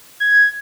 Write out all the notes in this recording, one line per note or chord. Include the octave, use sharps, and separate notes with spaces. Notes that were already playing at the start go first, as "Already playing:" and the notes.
G#6